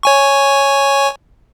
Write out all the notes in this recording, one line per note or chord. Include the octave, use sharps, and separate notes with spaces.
C#5 G#5 C#6